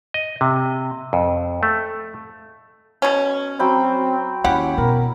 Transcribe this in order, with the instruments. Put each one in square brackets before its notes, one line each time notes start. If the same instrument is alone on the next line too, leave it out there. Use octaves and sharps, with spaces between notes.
[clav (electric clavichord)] D#5
C3
F2
A3
[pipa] B2 C#4
[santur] F#3 G5 B5 [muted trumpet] C4
[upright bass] D#2 [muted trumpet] C#4 [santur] E4 [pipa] G4 F#5
[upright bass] B2 [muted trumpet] A#4